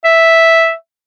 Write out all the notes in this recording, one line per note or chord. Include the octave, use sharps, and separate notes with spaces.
E5